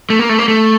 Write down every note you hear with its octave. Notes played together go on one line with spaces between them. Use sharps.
A3
A#3
A3
A#3
A3